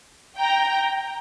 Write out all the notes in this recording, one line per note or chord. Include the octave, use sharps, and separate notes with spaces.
G5 A#5